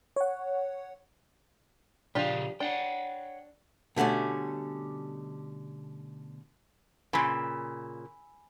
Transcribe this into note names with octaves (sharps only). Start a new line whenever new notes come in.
C#5 F#5
A#2 C#3 F3 D4 G4 F5
D4 C#5 F#5 G5
B2 D3 G3 A3 C#4
A#2 C#3 G#5 B5 E6